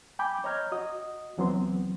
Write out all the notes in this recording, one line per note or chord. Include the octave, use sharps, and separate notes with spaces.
G5 G#5 B5 D6 G6
C#5 D#5 A#5 F6 G6 G#6
F#4 D#5 D#6
C#2 E3 F#3 B3 C4 C6